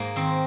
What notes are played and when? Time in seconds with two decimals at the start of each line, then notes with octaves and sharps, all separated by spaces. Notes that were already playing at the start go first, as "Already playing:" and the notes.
Already playing: G#2 A#3
0.16 D#3 C4